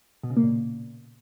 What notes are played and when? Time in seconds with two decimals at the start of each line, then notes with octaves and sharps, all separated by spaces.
0.23 B2
0.30 C#3
0.37 A#3
0.43 A#2